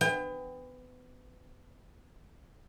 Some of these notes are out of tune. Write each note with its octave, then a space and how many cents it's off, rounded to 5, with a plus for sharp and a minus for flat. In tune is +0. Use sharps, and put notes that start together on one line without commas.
B3 +30 G5 +35